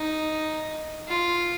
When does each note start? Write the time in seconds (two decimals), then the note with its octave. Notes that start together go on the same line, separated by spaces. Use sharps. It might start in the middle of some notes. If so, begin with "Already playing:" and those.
Already playing: D#4
1.09 F4